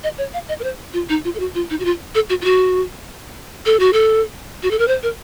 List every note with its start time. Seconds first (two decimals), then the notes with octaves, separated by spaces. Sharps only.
0.04 D#5
0.18 C#5
0.34 F5
0.49 D#5
0.60 A#4
0.64 C5
0.93 F4
1.09 D#4
1.25 F4
1.35 A4
1.40 F#4
1.55 F4
1.70 D#4
1.80 F#4
1.85 F4
2.15 A4
2.30 F#4
2.42 F4
2.45 F#4
3.66 A4
3.79 F#4
3.93 A4
4.63 F#4
4.71 A4
4.79 A#4
4.88 C5
5.03 A#4